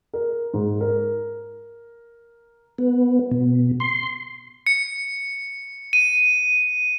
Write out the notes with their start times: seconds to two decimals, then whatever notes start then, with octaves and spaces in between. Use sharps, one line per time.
0.13 A#4
0.54 G#2
0.81 A#4
2.78 B3
3.31 B2
3.80 C6
4.67 C#7
5.93 D#7